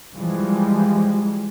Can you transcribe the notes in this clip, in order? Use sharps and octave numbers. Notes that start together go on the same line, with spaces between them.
E3 F3 G3 G#3